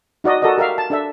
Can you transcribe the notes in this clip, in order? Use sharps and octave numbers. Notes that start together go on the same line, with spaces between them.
D#4 F#4 D5 D#5
F#4 A4 A#4 D5 D#5
G4 A#4 E5 F5
A5
D4 A4 E5